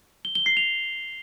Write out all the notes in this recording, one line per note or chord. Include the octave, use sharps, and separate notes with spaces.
G7
G7
C7
F7